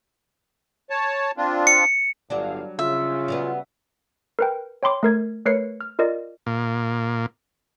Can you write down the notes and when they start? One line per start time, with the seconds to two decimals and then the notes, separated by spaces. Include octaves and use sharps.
0.90 C#5 A5
1.37 C4 D4 F4
1.67 C#7
2.30 G1 A2 F#3 G3 D4 F5
2.79 C#3 F4 E5
3.28 F#3 G3 B3
4.39 A#4 B4 G5
4.83 C#5 G5 B5 C6 D6
5.03 A3 A#4 G#6
5.46 A3 A#4 B4 C#5 C7 C#7
5.81 F6
5.99 F4 A#4 D5 D#5
6.47 A#2